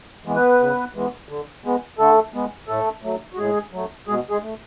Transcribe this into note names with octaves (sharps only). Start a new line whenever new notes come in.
E3 G#3 B3
B3 B4
C#3
E3 G#3 B3
D3
G#3 B3
D3 A3 A4
G#3 B3
A2 A3 A4
F#3 A3
F#4
A2 G#3 G#4
F#3 A3
B2 G#3 G#4
G#3 G#4
A3